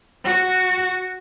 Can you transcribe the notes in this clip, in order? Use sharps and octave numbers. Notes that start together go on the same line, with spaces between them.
F#4